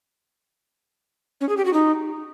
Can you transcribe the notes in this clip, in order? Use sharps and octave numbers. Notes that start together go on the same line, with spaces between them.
C#4
G#4
G4
F#4
D#4